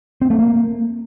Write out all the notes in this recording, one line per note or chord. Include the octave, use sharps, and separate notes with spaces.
C4
A3
A#3